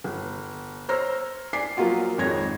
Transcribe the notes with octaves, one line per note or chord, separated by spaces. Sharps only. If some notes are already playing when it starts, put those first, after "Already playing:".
G1
C5 C#5 A#5 E6 F6 A#6
D5 G#5 D6 B6 C7
F3 F#3 A#3 F4 F#4
G#1 F2 G#3 C#5 G#6 A#6